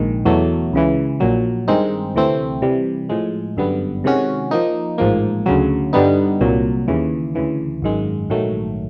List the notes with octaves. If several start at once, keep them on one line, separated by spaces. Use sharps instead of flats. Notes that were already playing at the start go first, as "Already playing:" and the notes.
Already playing: A#1 G#2 D#3
E2 B2 F#3 A3
C#2 C#3 E3
A#1 A#2 F#3
G2 D#3 G#3 C4 D#4
D2 C3 E3 A3 C4
C3 E3 G3
A2 F3 G#3
G1 F#2 D3 G3 B3
C3 D#3 G#3 C#4 F#4
F3 A#3 D#4
A1 G#2 F3 A#3
D2 C#3 F#3
G2 D3 G3 B3 D#4
C2 A#2 F#3
D#2 C#3 E3
D2 C#3 E3
G#1 F#2 D#3 G#3
A#1 G#2 D#3 F#3 A3